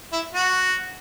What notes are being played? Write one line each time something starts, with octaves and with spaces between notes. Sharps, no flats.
E4
F#4